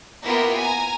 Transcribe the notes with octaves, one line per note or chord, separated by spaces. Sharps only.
A#3 B3 E4 F4 G4 A#4
G#5 A#5